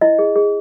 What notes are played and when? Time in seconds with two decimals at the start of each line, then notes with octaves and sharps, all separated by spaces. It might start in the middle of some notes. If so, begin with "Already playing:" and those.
0.01 E4 D#5
0.19 G#4
0.36 G#4